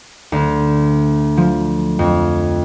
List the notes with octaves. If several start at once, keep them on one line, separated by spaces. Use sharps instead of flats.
D2
F3
F2